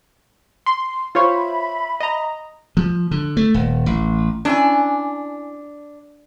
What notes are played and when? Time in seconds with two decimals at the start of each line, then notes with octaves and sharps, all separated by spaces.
0.66 C6
1.15 F4 C5 C#5 E5 B5
2.00 D#5 A#5
2.77 F3
3.11 D3
3.37 A3
3.54 D#1
3.86 A1
4.45 C#4 D4 E4 G#5